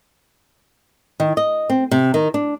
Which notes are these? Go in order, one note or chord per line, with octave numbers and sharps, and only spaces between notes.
D#3
D#5
C4
C3
D#3
D4